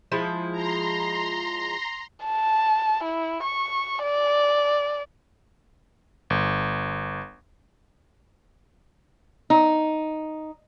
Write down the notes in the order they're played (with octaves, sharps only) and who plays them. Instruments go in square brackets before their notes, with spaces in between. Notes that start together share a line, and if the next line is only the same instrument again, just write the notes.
[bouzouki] F3 G#3 E4
[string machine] A#5 C6
[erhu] A5
E4
C#6
D5
[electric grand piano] G1
[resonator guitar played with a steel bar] D#4